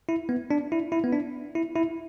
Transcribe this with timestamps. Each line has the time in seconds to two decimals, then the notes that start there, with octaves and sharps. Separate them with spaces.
0.09 E4
0.29 B3
0.51 D4
0.72 E4
0.92 E4
1.04 B3
1.12 D4
1.55 E4
1.76 E4